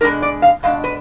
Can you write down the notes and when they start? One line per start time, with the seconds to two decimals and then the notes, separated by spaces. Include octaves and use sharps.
0.01 B2 G#3 D4 A#4
0.22 D5
0.42 F5
0.63 B2 G#3 D4 F5
0.84 B4